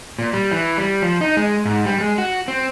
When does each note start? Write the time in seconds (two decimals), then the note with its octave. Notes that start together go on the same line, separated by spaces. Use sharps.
0.19 A#2
0.33 G3
0.51 E3
0.77 G3
1.02 F3
1.21 D#4
1.37 G#3
1.65 G#2
1.86 G3
2.01 G#3
2.18 F#4
2.48 C4